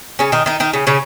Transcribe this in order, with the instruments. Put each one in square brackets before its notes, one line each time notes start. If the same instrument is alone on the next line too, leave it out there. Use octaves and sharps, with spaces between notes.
[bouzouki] C#3 C#4
D#3 D#4
D#3 D#4
D#3 D#4
C#3 C#4
C#3 C#4